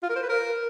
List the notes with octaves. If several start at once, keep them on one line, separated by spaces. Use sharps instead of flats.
F4
A#4
C5
B4
A#4